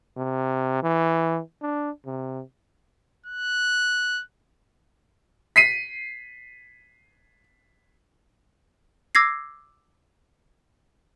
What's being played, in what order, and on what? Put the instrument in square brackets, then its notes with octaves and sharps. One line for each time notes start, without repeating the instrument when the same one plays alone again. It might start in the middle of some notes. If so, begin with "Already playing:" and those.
[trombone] C3
E3
D4
C3
[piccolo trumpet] F#6
[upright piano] B6 C7 D#7
[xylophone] D6 E6 G#6 A#6 C7